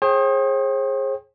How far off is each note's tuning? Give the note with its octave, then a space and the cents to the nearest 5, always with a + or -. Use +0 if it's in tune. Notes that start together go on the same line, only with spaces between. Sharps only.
G#4 +0 C5 +45 G5 +0